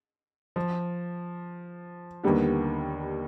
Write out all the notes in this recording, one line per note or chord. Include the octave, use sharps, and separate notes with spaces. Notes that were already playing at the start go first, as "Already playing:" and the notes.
F3
D#2 D3 D#3 G3 B3